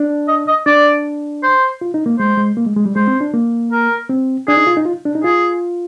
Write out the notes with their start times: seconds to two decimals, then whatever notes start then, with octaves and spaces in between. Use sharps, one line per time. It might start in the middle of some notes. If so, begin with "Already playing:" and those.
Already playing: D4
0.28 D#5
0.48 D#5
0.66 D4 D5
1.43 C5
1.81 F4
1.94 D#4
2.06 A#3
2.19 G#3 C5
2.37 G#3
2.57 A#3
2.66 G#3
2.76 G#3
2.86 G3
2.96 G#3 C5
3.07 C4
3.21 D4
3.34 A#3
3.72 A#4
4.09 C4
4.48 D4 G#4
4.57 D#4
4.67 F4
4.77 D#4
4.85 F4
5.06 D4
5.15 D#4
5.24 F4 G#4